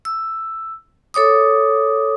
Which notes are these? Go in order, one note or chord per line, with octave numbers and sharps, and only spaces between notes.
E6
A4 C#5 D6 D#6